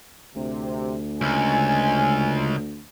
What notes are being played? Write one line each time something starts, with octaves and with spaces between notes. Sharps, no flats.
D2 C3
C#2 G#5